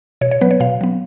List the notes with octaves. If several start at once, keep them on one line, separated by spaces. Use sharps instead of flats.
B2 C#5
C#5
F#3 B3 B4
C#5
B2 F5
F#3 B3